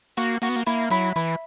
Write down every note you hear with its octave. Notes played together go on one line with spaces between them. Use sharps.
A#3 F#4
A#3 F#4
B3
A#3
A#3 E4
F#3 E4
E3 E4